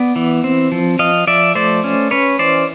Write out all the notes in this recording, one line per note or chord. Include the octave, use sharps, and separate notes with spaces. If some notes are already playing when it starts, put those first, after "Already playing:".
Already playing: B3 D5
E3
C4
F3
F3 D#5 F5
F3 D5 E5
A3 C5 D5
C#4
C#4 B4 C#5
E3 C5 D5